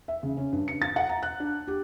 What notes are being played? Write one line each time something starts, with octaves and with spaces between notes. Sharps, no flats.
E5
C#3
C#4
G2
C#7
A6
F#5
A#5
F#6
D4
G4